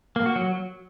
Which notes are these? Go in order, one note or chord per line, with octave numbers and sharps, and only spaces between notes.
A#3
F#4
F#3